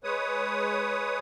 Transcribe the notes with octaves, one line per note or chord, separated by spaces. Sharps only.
G#3 B4 C#5 D#6